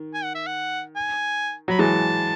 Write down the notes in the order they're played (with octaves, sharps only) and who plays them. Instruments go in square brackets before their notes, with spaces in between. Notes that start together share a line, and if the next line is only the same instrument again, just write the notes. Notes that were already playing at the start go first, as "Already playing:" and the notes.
Already playing: [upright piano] D#3
[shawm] G#5
F#5
E5
F#5
G#5
[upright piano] F#3 [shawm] B5
[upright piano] E3 G#3 [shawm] A5